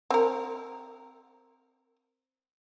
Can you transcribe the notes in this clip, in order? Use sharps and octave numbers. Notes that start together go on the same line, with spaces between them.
C4 A#4